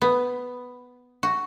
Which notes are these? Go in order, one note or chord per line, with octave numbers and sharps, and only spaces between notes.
B3
F#4